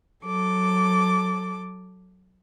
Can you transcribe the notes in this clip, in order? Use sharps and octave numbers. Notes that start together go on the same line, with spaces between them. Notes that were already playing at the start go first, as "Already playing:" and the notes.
F#3 A4 D6